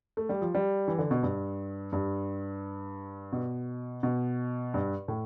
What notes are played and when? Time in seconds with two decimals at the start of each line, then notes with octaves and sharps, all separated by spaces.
0.17 A3
0.29 G3
0.41 F3
0.55 G3
0.88 E3
0.98 D3
1.11 B2
1.23 G2
1.93 G2
3.32 B2
4.03 B2
4.74 G2
5.08 A2